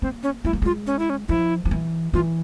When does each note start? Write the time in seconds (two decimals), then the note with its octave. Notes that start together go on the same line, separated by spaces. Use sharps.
0.02 A#3 C4
0.23 C#4
0.45 G#3 E4
0.53 A#3
0.62 G#3 F4
0.87 C#4
0.99 E4
1.10 C#4
1.29 F3 E4
1.65 F3
1.71 E3
2.14 E3 F4